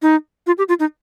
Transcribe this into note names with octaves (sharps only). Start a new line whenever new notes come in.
D#4
F4
G4
F4
D#4